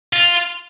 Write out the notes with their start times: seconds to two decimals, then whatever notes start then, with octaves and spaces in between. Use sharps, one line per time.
0.13 F4